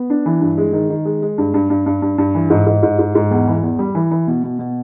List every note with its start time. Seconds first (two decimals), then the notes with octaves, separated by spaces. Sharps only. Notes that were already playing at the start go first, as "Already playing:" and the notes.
Already playing: B3
0.10 D4
0.26 E3
0.41 G2
0.58 G#3
0.73 D#3
0.90 D#3
1.05 G#3
1.22 G#3
1.38 G2
1.54 G2
1.70 G2
1.86 G2
2.02 G2
2.18 G2
2.35 E3
2.50 G#2
2.67 G#2
2.83 G#2
2.99 G#2
3.15 G#2
3.31 E2
3.47 E3
3.63 E2
3.79 G3
3.95 E3
4.11 E3
4.27 B2
4.44 B2
4.59 B2